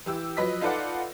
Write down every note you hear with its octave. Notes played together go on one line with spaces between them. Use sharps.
E3 G4 E6
F3 F#3 B4 D#5 B6
D#4 F4 A4 B4 D5 F#5